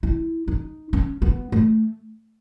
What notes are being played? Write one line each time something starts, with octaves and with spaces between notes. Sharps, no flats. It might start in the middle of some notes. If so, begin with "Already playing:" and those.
E4
D#4
C#4
B3
A3